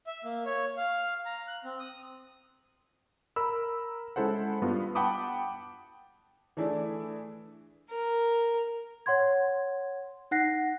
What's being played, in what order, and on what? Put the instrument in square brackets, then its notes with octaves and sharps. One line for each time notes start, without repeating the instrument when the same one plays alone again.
[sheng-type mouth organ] E5
A#3
C#5
F5
A#5
F#6
C4
D#6
[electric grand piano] A#4 B5 E6
G#3 C#4 E4 A4 C5 F#5
G2 B3 F4
F#5 G5 A5 B5 D6 D#6
[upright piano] E3 A3 D4 E4 G#4 D5
[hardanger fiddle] A#4
[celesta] C#5 F#5 C6 G#6
D#4 F#5 F#6 A#6 C7